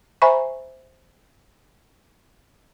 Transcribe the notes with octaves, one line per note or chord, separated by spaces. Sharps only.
C5 E5 G#5 A#5 B5 C#6